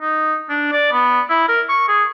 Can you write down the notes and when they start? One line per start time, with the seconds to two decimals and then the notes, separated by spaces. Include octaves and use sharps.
0.01 D#4
0.49 D4
0.72 D5
0.92 B3
1.30 E4
1.48 A#4
1.69 C#6
1.88 G#4